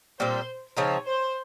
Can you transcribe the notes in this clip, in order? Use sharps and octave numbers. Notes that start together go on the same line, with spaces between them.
A#2 G3 C4 C5
C#3 F3 C4 D#4 C#5
C5